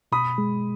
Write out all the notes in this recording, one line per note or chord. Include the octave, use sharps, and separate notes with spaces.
B2 B5 D#6
G#3